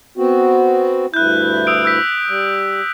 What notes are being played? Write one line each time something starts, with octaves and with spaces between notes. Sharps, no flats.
B3 C4 F#4
D2 G2 E4 F#6 G6
D#6 E6 D7
E6 G6 B6
G3